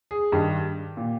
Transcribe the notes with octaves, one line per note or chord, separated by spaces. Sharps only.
G#4
G2 D#3 G4
A#2